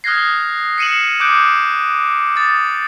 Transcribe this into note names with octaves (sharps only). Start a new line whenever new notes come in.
D#6 F6 F#6 G#6 A#6 C7
C7 C#7 D#7 E7 F#7
D6 D#6 F#6 G6 D7
D#6 A6